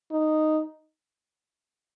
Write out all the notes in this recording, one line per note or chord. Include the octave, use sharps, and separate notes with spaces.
D#4